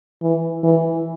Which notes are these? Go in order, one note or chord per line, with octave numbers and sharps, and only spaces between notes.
E3
E3